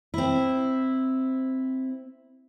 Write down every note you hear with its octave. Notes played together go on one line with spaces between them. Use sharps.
C4 E4